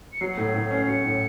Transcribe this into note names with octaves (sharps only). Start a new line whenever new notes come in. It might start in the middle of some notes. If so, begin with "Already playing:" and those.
C#7
F#3 C7
A2
A2
C#4
F#3 C#7
A2